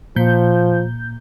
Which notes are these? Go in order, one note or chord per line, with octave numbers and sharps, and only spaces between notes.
A#2 F3 G6